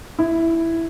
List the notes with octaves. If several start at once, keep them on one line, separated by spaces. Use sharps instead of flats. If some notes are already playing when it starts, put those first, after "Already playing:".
E4